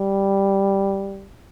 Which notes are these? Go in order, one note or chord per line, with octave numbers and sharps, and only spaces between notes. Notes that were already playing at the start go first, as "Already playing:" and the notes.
Already playing: G3